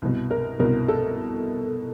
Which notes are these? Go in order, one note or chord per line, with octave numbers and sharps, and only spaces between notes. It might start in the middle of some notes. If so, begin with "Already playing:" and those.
C2 B2
A#4
C2 B2 A#4
A4